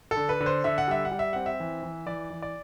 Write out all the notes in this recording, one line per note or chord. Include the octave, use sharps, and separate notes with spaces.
A4
D3
B4
D3
C5
D3 E5
F#5
G3 E5
F#5
G3
E5
C4 F#5
E5
E3
E3
E3 D5
E3
D5